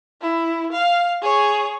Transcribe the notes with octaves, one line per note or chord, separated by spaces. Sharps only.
E4
F5
G#4 C#5